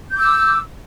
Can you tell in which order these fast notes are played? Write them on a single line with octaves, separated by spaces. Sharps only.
G6 D6 E6